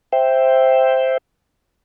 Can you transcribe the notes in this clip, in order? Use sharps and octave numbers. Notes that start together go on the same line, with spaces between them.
C5 E5 G5